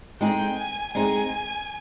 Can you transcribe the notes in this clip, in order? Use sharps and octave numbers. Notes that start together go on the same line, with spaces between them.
G#3 C4 D#4 G#4 G5
G#5
G#3 C4 D#4 G#4 G#5